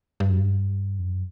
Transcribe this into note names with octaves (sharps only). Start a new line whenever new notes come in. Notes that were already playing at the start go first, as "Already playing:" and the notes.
G2
F#2
G2
F2
F#2